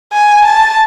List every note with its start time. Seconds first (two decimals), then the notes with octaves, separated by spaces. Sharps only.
0.13 G#5
0.45 A5